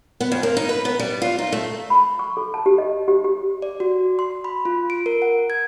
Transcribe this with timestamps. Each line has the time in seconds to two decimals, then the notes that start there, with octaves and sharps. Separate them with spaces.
0.20 B3
0.32 F2
0.43 A#3
0.57 D#4
0.69 B4
0.85 B3
0.99 G3
1.22 F4
1.39 D#4
1.52 A3
1.90 B5
2.19 C#6
2.37 A4
2.54 A5
2.66 G4
2.78 D#5
3.08 G4
3.24 G4
3.62 D5
3.80 F#4
4.19 C6
4.44 B5
4.65 F4
4.90 D7
5.06 A#4
5.22 F#5
5.50 G#6